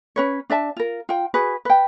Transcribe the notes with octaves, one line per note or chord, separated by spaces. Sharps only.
C#4 B4 C#5
D4 D5 E5 A5
F4 A#4
F4 G5
F#4 G#4 B4
B4 G5